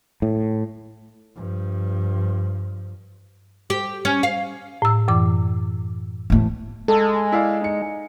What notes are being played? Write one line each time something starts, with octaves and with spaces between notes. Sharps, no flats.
A2
G2 F3
G4
C#4
F5
A2 E6
F#2 E3 D6
E2 A2
G#3 A4
E4 D5 F5
D#4 C#7